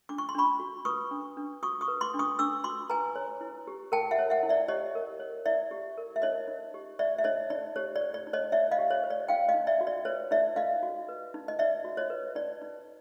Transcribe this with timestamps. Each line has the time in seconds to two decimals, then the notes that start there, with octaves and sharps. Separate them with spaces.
0.09 D4 D6
0.18 C#6
0.29 C6
0.35 D4 B5 C#6
0.60 F#4
0.85 B4 C#6 D#6
1.11 D4
1.37 D4
1.63 F#4 C#6 D#6
1.81 C#6 D#6
1.88 B4
2.01 C6 D6
2.14 D4
2.19 C#6 D#6
2.39 D4 D6 E6
2.64 F#4 C6 D6
2.90 B4 G#5 A#5
3.15 C#5
3.41 E4
3.67 G4
3.92 A#4 G5 A5
4.11 E5 F#5
4.19 C#5
4.30 E5 F#5
4.43 E4
4.49 D5 E5
4.68 G4 C#5 D#5
4.95 A#4
5.20 C#5
5.46 E4 D5 E5
5.71 G4
5.97 A#4
6.16 E5
6.22 D#4 C#5 D#5
6.48 D#4
6.74 G4
6.99 C5 D5 E5
7.18 E5
7.24 D#4 C#5 D#5
7.50 D#4 D5
7.76 G4 C#5
7.96 D5
8.01 C5
8.14 D5
8.27 D#4
8.33 C#5 D#5
8.52 D#4 D5 E5
8.71 D#5 F5
8.78 G4
8.91 C#5
9.04 C5
9.10 D5
9.28 D#4 F5 G5
9.48 D#5 F5
9.54 D#4
9.67 D5 E5
9.81 F#4
9.87 D5
10.05 B4 C#5
10.31 D#4 D5 E5
10.56 D#4 D#5 F5
10.83 F#4
11.09 B4
11.34 D#4
11.48 D#5
11.59 D#4 D5 E5
11.84 F#4
11.97 C#5 D#5
12.10 B4
12.35 D#4 D5
12.61 D#4